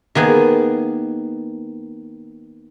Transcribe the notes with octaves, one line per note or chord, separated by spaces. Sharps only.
D#3 A#3 B3 G#4